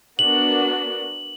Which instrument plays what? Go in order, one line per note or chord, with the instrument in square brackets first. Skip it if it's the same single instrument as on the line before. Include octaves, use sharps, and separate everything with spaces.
[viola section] B3 D4 F#4 A#4 [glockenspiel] F#7